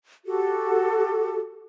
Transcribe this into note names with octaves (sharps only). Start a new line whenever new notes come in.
F#4 G4 A4